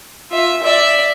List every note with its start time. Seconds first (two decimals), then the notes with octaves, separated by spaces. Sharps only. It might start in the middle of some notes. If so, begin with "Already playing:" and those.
0.31 F4 E5
0.63 D5 E5